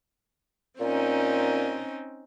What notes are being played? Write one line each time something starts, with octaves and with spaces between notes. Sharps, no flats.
A#2 C4 C#4 D#4